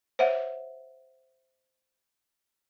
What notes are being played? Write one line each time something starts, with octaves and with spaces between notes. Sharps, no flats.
C5 C#5 E5 F#5